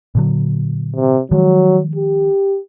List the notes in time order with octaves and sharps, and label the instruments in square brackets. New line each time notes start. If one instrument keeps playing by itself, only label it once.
[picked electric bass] A#2 D3 F#3
[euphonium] C3
[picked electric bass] D#3 F3 G#3 [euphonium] F#3
[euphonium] G4